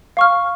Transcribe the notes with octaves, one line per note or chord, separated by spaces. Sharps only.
F5 C#6 F6